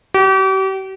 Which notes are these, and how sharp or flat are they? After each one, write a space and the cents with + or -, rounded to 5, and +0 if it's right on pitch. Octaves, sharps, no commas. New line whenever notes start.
G4 -40